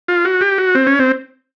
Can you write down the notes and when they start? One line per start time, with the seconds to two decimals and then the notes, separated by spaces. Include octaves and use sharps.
0.08 F4
0.25 F#4
0.41 G4
0.58 F#4
0.75 C4
0.87 C#4
0.99 C4